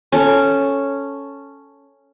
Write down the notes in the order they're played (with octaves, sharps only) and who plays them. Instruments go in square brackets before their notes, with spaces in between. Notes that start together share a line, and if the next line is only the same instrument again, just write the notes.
[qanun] C#4 A4